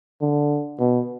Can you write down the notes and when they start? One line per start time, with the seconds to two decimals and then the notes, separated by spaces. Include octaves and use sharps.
0.21 D3
0.79 B2